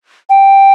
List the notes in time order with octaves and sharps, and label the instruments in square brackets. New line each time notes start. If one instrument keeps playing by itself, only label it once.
[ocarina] G5